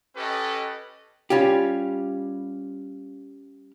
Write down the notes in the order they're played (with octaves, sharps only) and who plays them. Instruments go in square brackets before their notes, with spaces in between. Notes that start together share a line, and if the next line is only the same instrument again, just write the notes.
[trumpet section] C#4 G4 A4 B4 D#5
[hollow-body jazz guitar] G3 C#4 F4 G4